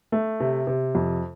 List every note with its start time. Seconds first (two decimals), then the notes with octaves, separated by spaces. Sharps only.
0.12 A3
0.40 C3
0.67 C3
0.95 F2